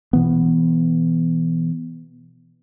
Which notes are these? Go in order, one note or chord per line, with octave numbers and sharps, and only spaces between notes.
B2 E3 B3